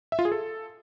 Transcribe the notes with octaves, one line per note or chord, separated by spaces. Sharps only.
E5
F4
G#4
A4